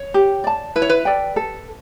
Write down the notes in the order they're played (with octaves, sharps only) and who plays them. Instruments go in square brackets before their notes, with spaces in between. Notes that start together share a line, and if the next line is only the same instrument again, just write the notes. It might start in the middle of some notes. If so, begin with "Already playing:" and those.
Already playing: [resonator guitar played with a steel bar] C#5
[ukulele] G4
D5 A5
[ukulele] E4 [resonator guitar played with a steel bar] B4
[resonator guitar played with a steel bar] C#5
B4
[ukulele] A4 D5 G5
A4